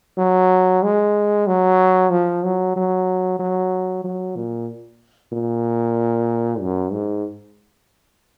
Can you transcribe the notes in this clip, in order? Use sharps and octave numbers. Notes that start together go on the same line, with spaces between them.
F#3
G#3
F#3
F3
F#3
F#3
F#3
F#3
A#2
A#2
F#2
G#2